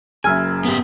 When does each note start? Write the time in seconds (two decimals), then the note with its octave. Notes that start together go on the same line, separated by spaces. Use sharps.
0.24 F#1 F#2 E5 G#5 E6 F6 G#6
0.65 B3 G4